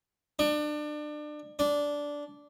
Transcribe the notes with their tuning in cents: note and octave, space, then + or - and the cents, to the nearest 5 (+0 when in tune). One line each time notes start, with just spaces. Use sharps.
D4 +30
D4 -10